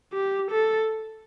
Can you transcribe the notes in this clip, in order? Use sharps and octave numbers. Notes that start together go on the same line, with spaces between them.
G4
A4